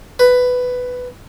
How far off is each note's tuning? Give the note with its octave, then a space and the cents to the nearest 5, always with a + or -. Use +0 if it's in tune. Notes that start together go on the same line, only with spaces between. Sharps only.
B4 +10